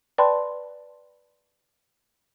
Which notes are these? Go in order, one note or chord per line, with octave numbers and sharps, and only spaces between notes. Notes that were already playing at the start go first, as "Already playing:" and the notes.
B4 D5 G5 A5 B5 C6